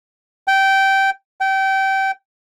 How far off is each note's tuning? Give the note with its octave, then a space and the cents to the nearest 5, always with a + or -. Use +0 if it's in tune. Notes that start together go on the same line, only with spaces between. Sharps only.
G5 -15
G5 -25